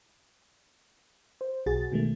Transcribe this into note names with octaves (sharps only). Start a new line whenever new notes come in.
C5
B1 F#4 G#4 A6
B2 D#3 G#3 A3